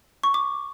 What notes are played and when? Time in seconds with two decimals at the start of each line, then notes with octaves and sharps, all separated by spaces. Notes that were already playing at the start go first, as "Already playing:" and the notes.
0.23 C#6
0.34 D6